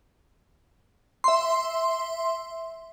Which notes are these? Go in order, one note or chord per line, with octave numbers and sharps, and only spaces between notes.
E5 C6